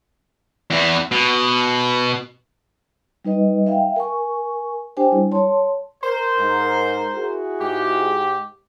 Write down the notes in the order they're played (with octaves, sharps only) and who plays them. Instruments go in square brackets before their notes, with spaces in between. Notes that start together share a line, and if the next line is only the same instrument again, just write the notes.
[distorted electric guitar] E2 E3
B2
[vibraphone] G3 D#4 B4 D#5
E5 F5 G5
A#4 G#5 C#6
D4 G4 C5 G5 G#5
G3 E4
C#5 A5 C6
[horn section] A#4 C5
[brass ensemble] G#2
E4 F#4 G#4
[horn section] G#2 G4